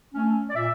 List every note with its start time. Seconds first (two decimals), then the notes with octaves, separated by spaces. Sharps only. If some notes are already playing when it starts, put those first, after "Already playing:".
0.14 A3 C#4
0.50 D5
0.55 A#2 E5